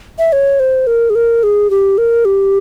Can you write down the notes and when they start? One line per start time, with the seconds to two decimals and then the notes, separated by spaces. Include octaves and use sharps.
0.19 E5
0.32 C#5
0.60 C5
0.87 A#4
1.10 G#4
1.15 A#4
1.43 G#4
1.70 G4
1.98 A#4
2.25 G4